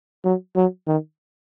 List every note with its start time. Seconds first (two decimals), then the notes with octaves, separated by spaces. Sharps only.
0.25 F#3
0.56 F#3
0.87 D#3